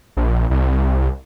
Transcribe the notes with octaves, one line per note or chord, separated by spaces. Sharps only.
A#1
C2